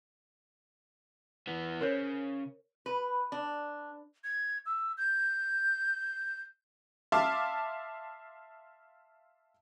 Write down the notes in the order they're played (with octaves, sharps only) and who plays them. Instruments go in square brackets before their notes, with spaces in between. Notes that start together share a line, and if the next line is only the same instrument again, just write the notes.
[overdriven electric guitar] E3 B3
[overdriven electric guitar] C#3 [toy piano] A#4 C5 C#5
[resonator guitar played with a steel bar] B4
D4
[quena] G#6
E6
G6
[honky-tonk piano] E5 F5 A5 C6 D6